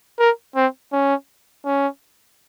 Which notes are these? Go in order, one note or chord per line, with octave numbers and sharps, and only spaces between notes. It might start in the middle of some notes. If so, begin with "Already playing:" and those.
A#4
C4
C#4
C#4